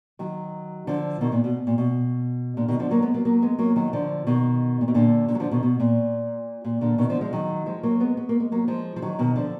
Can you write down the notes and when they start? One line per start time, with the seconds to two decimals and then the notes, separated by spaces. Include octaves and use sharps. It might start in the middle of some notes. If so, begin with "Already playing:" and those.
0.19 D#3 F#3
0.87 D3 F3
1.21 B2 D#3
1.32 A#2
1.44 B2
1.67 A#2
1.78 B2
2.57 A#2 D3
2.68 B2 D#3
2.79 D3 F3
2.91 F#3 A#3
3.02 G#3 B3
3.14 F#3 A#3
3.25 F#3 A#3
3.42 G#3 B3
3.59 F#3 A#3
3.76 D#3 F#3
3.93 D3 F3
4.27 B2 D#3
4.81 A#2
4.88 B2
4.94 A#2 D3
5.28 A#2 D3
5.35 F#3
5.40 D3 F3
5.51 B2 D#3
5.63 B2
5.80 A#2
6.65 A#2
6.81 A#2 D3
6.98 B2 D#3
7.09 D3 F3
7.21 F3 G#3
7.33 D#3 F#3
7.66 F3 G#3
7.83 F#3 A#3
8.00 G#3 B3
8.17 B3
8.29 A#3
8.40 G#3
8.52 F#3 A#3
8.68 F3 G#3
8.96 F3
9.02 D#3 F#3
9.19 B2 D#3
9.36 D3 F3